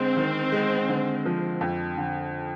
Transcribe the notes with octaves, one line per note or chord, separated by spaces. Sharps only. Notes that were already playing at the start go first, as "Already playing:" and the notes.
Already playing: D3 G#3 C4
D#3
G#3
D3
F3
F2
D3